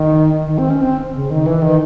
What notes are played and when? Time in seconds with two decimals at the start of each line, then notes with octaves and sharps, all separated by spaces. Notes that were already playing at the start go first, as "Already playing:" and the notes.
Already playing: D#3
0.46 D#3
0.58 C4
0.70 C#4
0.82 C4
1.14 C#3
1.30 D#3
1.46 E3
1.62 D#3